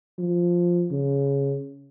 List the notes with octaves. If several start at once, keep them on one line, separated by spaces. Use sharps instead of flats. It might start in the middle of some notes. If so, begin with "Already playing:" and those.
F3
C#3